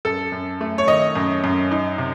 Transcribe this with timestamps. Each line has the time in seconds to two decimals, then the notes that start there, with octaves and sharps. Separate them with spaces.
0.05 F#2 A4
0.32 F#2
0.61 A3
0.78 C#5
0.87 D#3 D#5
1.15 F#2
1.44 F#2
1.71 D#4
1.98 C3